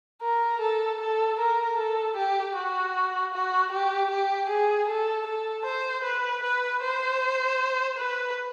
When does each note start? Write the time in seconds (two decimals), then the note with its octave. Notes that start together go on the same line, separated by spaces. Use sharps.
0.23 A#4
0.61 A4
1.01 A4
1.40 A#4
1.78 A4
2.17 G4
2.56 F#4
3.34 F#4
3.72 G4
4.10 G4
4.49 G#4
4.89 A4
5.27 A4
5.66 C5
6.04 B4
6.43 B4
6.83 C5
7.98 B4